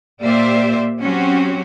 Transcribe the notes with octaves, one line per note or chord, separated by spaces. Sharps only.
A#2 A#3 G4 C5 D5 E5
F#3 C4 C#4 F#4 G4